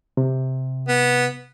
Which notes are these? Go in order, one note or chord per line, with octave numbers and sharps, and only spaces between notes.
C3
B3